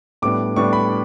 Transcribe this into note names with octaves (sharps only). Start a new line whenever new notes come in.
A2 G3 B3 D4 D6
A2 G3 B3 D4 C#6
B5